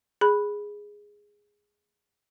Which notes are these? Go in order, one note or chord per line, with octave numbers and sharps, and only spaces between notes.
G#4 B5